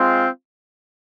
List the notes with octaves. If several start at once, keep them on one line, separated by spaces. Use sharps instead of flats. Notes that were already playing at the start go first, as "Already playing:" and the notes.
Already playing: G#3 C4 F4